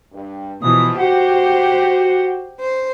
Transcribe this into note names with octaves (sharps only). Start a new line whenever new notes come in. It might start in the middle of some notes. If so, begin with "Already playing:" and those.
G2
B2 E3 F3 D#6
F#4 G4 C5 F#5
C5